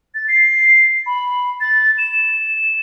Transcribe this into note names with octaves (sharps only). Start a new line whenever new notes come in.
A6
C7
B5
A6
E7